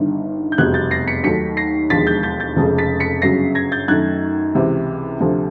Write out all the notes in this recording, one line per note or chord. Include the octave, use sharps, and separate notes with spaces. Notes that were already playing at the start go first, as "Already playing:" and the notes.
Already playing: G1 G2 D#3
G6
F1 E2 B2 G3 F#6 G#6
G6 A6
A#6 C7
B6 C#7
D#2 D#3 F#3 A3 B6 C#7
A#6 C7
E1 D#2 D3 F3 G#3 A6 B6
G6 A6
G6 A6
G6 A6
F1 F2 C#3 F3 G#3
A6 B6
B6 C#7
G1 F#2 C#3 F#3 A#6 C7
G#6 A#6
G6 A6
F#2 D#3 F#3 A3 F#6 G#6
C#2 C3 E3
D2 C3 F3 A3